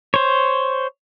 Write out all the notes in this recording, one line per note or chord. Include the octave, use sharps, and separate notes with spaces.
C5 C#5